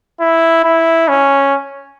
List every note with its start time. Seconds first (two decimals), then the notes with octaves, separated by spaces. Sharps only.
0.20 E4
0.64 E4
1.09 C#4